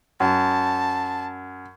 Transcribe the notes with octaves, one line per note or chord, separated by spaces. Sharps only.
F#2 A5